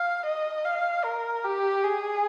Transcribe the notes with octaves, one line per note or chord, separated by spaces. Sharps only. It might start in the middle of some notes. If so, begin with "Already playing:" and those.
Already playing: F5
D#5
F5
A#4
G4
G#4